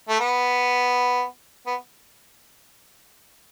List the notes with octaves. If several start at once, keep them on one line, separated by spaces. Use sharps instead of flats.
A3
B3
B3